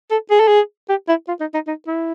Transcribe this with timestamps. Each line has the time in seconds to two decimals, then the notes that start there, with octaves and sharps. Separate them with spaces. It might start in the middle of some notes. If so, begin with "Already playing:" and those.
0.11 A4
0.30 G#4
0.40 A4
0.48 G#4
0.89 G4
1.08 E4
1.28 F4
1.40 D#4
1.54 D#4
1.67 D#4
1.87 E4